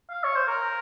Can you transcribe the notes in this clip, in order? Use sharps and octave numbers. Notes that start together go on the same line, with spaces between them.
F5
C#5
C5
A#4